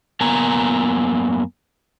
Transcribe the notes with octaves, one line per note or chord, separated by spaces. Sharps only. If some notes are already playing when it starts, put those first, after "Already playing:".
F#2 A#3 B3 G#5 A#5